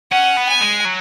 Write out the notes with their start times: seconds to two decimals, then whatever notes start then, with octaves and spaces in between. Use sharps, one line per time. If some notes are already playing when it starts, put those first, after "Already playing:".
0.12 C#4 F#5
0.37 B3
0.49 G#5
0.61 G#3
0.85 F#3